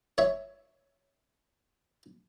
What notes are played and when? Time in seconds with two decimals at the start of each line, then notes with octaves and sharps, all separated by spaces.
0.18 C#5 E5